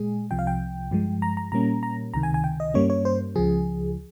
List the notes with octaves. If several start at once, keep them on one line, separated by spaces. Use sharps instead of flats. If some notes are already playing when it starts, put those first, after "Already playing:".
Already playing: A#2 G#3 G#4
C2 C3 F3 G5
F5
G5
G2 F3 G#3
A#5
A#5
A#2 G3 A#3 C#4 A#5
A#5
C#2 C3 D#3 A#5
G#5
G#5
G5
D#5
G2 G3 A#3 C#4 C#5
C#5
C5
C#2 C#3 F3 G#4